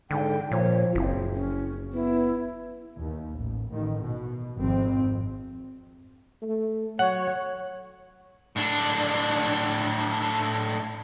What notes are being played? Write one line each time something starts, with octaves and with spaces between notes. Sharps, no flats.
G#2 D3 G5
A#2 F3 C#5
F#1 C4 E4
C#4
B3 E4
D#2
A1
A1 D#3
B2
G#1 F2 C4
A3
F#3 C#5 F#5
A2 D4